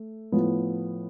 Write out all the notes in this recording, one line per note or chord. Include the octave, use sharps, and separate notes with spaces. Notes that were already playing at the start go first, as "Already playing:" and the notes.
Already playing: A3
A2 F3 B3